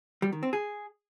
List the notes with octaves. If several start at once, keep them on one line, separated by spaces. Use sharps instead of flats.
G3
D#3
C4
G#4